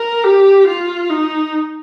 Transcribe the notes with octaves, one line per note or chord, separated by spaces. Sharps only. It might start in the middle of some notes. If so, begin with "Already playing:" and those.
Already playing: A#4
G4
F4
D#4